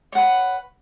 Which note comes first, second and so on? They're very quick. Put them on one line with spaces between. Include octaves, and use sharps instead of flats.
C#5 F#5 B4